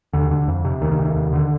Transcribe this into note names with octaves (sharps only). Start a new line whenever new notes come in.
D#2 D3
D3
F2
C3
D2 D#3
C3
D#2
D3